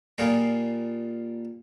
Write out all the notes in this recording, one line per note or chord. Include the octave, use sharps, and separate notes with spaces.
A#2 G3 A#3 F4 G#4